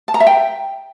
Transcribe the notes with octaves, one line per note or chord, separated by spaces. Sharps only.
A5
A#5
E5
G5